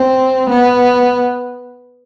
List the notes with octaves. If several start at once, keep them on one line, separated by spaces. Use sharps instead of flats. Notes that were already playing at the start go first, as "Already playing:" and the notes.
Already playing: C4
B3